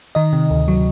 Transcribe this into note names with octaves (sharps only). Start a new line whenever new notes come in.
D#3 D#5
C3
D2
F#3